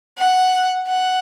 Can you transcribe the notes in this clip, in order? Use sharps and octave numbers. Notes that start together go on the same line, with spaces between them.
F#5
F#5